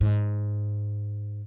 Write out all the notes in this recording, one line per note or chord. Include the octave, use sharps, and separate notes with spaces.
G#2